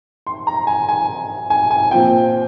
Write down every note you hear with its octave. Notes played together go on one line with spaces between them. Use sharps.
C6
A#5
G#5
G#5
G#5
G#5
A#2 F3 C4 F4 G5